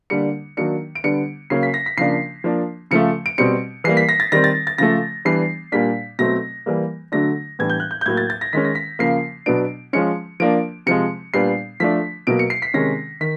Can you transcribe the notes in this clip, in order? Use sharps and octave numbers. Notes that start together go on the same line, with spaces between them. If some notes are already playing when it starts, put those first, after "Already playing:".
D3 G3 A#3 D4 C#7
D#3 F#3 A#3 D4 C#7
D7
D3 G3 B3 D4 C#7
C#3 F#3 A#3 C#4 C7
B6
A#6
B6
C#3 F3 A#3 D4 C7
F3 A#3 D4
C#3 F3 A3 C#7
D7
B2 G3 C4 C#7
E3 G3 A#3 C7
B6
A#6
A6
D#3 G3 C4 A#6
A6
A6
C#3 F3 A3 A#6
E3 G3 B3 D4 C7
A#2 G3 A#3 D4 B6
B2 F#3 A3 C4 A#6
E3 G3 A#3
D3 F#3 A3 D4 A#6
A2 E3 G3 B3 D4 G#6
G6
F#6
G6
G6
A2 F#3 A#3 G#6
A6
A6
A#6
D#3 G#3 C#4 B6
A#6
B6
C#3 F3 A#3 C7
B2 F#3 B3 D4 D7
F3 G#3 C#4 C#7
F3 A#3 D4 D7
C3 F3 G#3 C#7
A#2 G3 B3 D4 C7
F3 A3 D4 B6
B2 F#3 A#3 D7
C#7
C7
B6
C3 D#3 G#3 C#4 A#6
D#3 B6